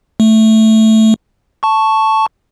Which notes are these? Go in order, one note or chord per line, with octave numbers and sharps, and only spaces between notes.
A3
A5 C#6